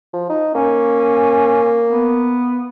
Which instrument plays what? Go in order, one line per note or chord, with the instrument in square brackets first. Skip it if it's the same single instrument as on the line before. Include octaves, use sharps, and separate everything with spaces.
[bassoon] F3
D#4
[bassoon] A#3 [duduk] C#4
[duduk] B3